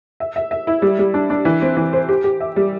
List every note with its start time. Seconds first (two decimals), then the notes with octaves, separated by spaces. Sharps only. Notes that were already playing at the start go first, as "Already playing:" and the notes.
0.20 E5
0.36 E5
0.51 E5
0.67 E4
0.82 G3
0.99 G3
1.14 D4
1.30 D4
1.45 E3
1.62 C4
1.77 E3
1.93 C5
2.09 G4
2.24 G4
2.40 E5
2.56 G3